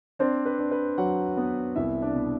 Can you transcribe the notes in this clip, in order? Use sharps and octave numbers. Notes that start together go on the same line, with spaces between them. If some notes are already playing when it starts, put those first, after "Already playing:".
C4 D4 C5
B4
D4
B4
F#3 F#4 F#5
B3
C2 E4 E5
D4 D5
B2